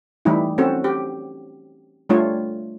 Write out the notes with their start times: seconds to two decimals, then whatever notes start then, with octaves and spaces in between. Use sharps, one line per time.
0.25 E3 G3 A3 D#4 E4
0.58 C4 C#4 F#4 A4
0.84 G4
2.09 G3 A3 D4 F4 C#5